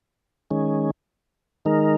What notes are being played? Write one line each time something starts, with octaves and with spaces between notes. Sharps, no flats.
D#3 G#3 C#4
D#3 G#3 D#4 A#4